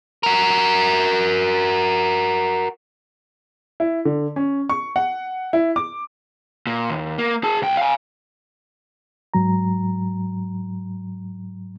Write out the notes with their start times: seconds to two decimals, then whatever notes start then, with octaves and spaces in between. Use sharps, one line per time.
0.23 F#4 A#4
3.80 E4
4.05 D3
4.36 C#4
4.69 C#6
4.96 F#5
5.53 E4
5.76 D6
6.67 A#2
6.90 D#2
7.18 A#3
7.43 G#4 A5
7.62 B1 G5
7.77 F5 G#5
9.34 G#2 F#3 A#5